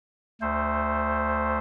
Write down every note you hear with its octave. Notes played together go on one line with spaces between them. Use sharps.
D2 A3 C5